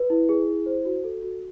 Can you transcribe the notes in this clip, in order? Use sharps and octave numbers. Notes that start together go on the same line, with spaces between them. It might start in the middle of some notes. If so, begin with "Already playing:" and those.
Already playing: B4
E4
G#4
E4
C5
F#4
A4
F#4